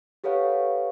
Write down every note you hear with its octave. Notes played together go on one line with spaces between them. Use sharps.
G4 A4 B4 C#5 F5 F#5